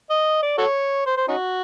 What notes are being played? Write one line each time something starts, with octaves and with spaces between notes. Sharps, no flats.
D#5
D5
F#4 A4 C#5
C5
C5
C#4 D#4 F#4